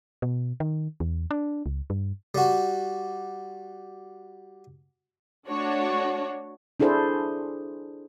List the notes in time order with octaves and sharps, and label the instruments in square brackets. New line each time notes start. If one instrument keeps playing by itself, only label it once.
[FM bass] B2
D#3
E2
D4
C#2
G2
[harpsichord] G3 F#4
[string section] A3 D4 F#4 C#5
[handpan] D4 E4 G#4 A4 C5